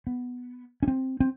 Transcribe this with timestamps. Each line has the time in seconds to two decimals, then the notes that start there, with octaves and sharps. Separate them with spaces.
0.07 B3
0.83 C#4
0.88 C4
1.20 C4